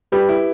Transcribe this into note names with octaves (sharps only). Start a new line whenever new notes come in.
G3 G4 B4
E4